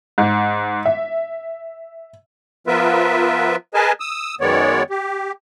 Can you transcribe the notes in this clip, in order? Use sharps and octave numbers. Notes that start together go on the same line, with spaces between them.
G#2
E5
F3 B3 F4 A#4 B4 E5
G#4 A#4 B4 D#5 G#5 A5
D#6 E6
F#2 D#3 G#3 B3 C#5 D5
G4